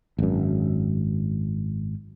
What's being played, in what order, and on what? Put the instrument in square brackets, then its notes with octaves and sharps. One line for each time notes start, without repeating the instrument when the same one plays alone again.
[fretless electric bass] G#1 F#2